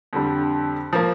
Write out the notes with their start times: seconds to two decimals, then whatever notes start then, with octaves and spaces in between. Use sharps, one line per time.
0.13 F2 D3 G3
0.93 F3 A#3